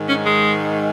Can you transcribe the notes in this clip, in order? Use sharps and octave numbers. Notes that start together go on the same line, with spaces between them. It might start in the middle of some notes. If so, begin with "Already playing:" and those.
Already playing: G#2 D#3
C#4
G#3